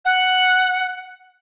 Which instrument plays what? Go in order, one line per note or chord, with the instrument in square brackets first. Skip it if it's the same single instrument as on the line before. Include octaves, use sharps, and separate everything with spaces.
[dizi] F#5